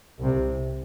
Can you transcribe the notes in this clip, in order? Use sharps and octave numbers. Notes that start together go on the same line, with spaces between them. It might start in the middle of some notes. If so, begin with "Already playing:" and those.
C2 C3